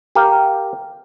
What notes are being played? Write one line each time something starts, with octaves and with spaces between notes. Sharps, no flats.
G4 A#4 F5